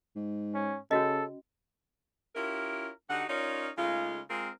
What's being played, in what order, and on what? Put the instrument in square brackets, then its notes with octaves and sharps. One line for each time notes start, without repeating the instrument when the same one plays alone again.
[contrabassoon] G#2
[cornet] C#4
[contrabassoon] C#3 [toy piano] C#4 F#4 D#5 [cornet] A4
[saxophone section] C#4 E4 F4 G4 A#4
D3 D#4 F#4 G4 F#5
C#4 D#4 F4 A#4 C#5 D5
C#3 G#3 A3 D#4 F4
G#3 C4 F4 G#4 A#4